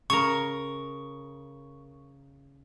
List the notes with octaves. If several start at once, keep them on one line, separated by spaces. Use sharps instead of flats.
C#3 A#4 C#6